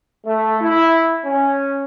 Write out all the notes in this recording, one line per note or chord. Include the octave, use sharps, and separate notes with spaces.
A3
E4
C#4